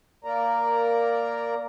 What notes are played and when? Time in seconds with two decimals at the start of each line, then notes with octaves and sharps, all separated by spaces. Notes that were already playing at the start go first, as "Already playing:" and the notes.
0.24 A#3 A#4 D5 A#5